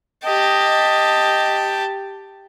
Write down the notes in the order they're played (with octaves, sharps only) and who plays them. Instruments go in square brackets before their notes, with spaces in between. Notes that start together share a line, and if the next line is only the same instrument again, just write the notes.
[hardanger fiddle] G4 A5 [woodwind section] D#5